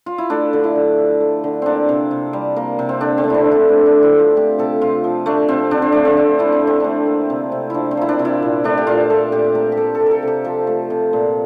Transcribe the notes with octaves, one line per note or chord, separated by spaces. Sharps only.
F4
E4
A3 D4
D3
E4
D3
F3
A3
D3
A#3 C4 D4
C3
C3
G3
A#3
C3
C4
D3 D4
C4
A3
D4 E4
D3
E4
A3
D4
D3
E4
A3
F4
A3 G4
C3 A4
C3 F4
F3
A3 D4
C3 C4
D3 D4
C4
A3 D4
C4
D3
A3 E4
D4
D3
C4
A3 D4
A#3
C3
C3
F3 D4 E4
C4
A#3 E4
D4
C3
E4
A#2
A3 D4
G4
A#2 F4
A3 A4
A#2 G4
A3 A#4
G4
A3 A4
A4
C3
A4 A#4
C3
G4
F3 A4
A3
C3
A#2